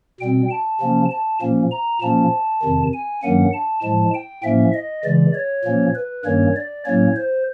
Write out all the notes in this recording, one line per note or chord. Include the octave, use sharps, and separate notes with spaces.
B2 G3 C4 G5
A5
C3 F3 A#3 C#4
A5
A#2 F3 A#3 C#4
A#5
A#2 F3 A#3 C#4 A5
F2 C3 D#3
G#5
G2 D#3 F#3 A#3 C#4 F#5
A5
A2 F3 G#3 A5
G5
A2 F3 A#3 C#4 E5
D#5
C#3 E3 G#3 D5
C#5
A#2 F3 A#3 C#4
B4
G2 D#3 G3 A#3 C#4 C#5
D5
A2 F#3 A#3 C#4 C#5
C5